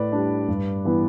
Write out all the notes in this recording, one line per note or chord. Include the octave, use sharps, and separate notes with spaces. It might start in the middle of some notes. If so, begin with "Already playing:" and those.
Already playing: A2 B4 D5
G3 D4
G2
E3 B3 E4